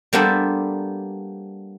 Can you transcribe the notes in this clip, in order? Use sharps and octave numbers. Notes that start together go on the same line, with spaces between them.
G3 A#3 B3 D4 A4 C5